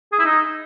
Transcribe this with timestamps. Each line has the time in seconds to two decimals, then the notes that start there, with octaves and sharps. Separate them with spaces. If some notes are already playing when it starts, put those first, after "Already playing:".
0.12 G#4
0.19 E4
0.25 D#4